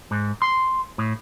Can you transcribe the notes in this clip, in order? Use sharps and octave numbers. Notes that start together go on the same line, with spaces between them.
G#2
C6
A2